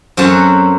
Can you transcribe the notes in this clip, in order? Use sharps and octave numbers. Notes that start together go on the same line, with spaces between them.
F#2 F#3 C4 F#4 A4